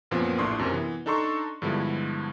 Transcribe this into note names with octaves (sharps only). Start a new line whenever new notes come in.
F#2 A#2 F3 B3 C4 F4
A#1 A2 D4 C6 C#6 D#6
F#2 C3 C4 A#4
E3 B3
D4 D#4 A4 A#5 C6 C#6
G2 D3 F3 G#3 B3 E4